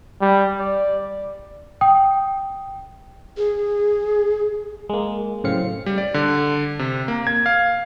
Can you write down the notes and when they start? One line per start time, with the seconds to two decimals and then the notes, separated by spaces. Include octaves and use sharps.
0.21 G3
0.59 D5
1.81 G5 D#6
3.37 G#4
4.89 G#3 A#3
5.44 F#2 A2 C#3 C4 F5 C#7
5.86 G3
5.98 D5
6.14 D3
6.79 C3
7.08 A#3
7.27 G#6
7.46 F5